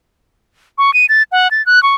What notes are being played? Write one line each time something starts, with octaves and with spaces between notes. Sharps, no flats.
C#6
D#7
A6
F#5
A6
F#6
C#6